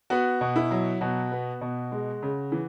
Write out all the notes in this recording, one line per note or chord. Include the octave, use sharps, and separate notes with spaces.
B3 F#4
B2
E4
F#3
B2 F#4
B3
B2
G#3
C#3
E3